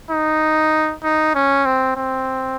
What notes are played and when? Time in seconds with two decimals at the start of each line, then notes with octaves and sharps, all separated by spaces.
0.11 D#4
1.03 D#4
1.35 C#4
1.66 C4
1.96 C4